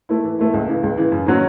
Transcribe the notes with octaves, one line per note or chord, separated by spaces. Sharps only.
A3 E4
E3
A3 E4
C#2
C#3 E3
C#2
C#3 E3
F#2
D#3 F#3 C#4 F#4